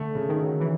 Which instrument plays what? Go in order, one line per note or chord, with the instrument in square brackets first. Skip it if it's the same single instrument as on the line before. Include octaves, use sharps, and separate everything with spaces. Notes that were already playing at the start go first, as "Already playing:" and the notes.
Already playing: [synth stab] D3 [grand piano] A3
[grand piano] C#3
[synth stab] D#3
[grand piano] F#3
[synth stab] E3